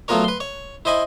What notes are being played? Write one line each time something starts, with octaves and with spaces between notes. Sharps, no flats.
F#3 A3 B3 F4 A#4 C#5
B4 C6
C#5
E4 C5 D#5 G#5 B5